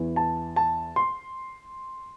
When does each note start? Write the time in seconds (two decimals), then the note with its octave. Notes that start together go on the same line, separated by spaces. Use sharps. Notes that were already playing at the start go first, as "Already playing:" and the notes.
Already playing: E2 E3
0.16 A5
0.56 A5
0.96 C6